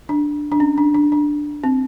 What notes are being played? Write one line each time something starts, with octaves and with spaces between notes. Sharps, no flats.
D4
D4
C#4
D4
D4
D4
C4